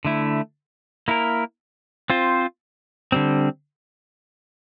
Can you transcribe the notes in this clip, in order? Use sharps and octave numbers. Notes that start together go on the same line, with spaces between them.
D3 A3 E4
A#3 E4 A#4
C4 F4 C5
D3 G3 C4